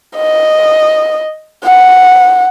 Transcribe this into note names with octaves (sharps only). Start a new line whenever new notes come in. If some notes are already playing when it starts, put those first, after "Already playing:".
D#5
F#5